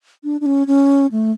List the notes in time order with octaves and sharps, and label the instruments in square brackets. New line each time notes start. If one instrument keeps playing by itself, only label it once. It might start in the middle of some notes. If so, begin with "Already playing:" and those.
[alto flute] D4
D4
C#4
C#4
A3